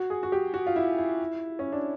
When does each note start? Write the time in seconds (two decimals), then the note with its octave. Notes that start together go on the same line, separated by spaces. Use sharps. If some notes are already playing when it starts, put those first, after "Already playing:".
Already playing: F#4
0.10 G#4
0.23 F#4
0.32 G4
0.54 F#4
0.66 F4
0.76 E4
0.98 E4
1.59 C#4
1.72 D4